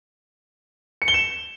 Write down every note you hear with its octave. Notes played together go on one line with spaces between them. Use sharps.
C#7
G7
E7